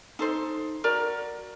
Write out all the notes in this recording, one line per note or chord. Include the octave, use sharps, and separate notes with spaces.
D#4 A4 C5
F#4 A#4 D5 A#5